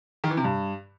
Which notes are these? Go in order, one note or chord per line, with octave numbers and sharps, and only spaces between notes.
D#3
E3
C3
G2